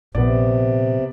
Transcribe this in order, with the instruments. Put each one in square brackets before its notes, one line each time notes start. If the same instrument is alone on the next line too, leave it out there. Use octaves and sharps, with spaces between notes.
[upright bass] A#1 [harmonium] C3 [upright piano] B3 D5